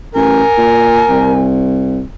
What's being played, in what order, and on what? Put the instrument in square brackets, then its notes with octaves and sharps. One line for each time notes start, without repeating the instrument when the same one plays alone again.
[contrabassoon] A1 [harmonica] A#4 [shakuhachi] G#5
[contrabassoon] A#2
C2